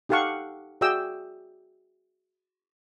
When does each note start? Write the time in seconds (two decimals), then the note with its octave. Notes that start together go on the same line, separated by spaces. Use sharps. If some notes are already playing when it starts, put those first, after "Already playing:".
0.09 D#4 G4 A4 F5 F#5 C#6
0.81 F#4 G#4 D5 E5 G5 E6